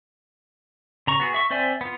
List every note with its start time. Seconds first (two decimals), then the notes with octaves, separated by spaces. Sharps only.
1.07 C#3 A#5 C#6
1.20 B3 F#4 G#4
1.34 E5 C#6
1.50 C4 C5 D5 E5 G#5
1.81 B3 F4